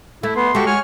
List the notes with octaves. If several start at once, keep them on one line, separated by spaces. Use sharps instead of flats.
A3 E4
B3 C6
G#3 F#4 G4 A4 C#6
C#5 G#5 C#6 F6